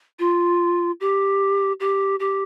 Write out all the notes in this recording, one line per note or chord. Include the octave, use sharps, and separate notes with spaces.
F4
G4
G4
G4